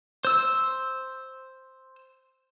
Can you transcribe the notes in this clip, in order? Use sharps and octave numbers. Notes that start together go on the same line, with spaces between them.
C5 E6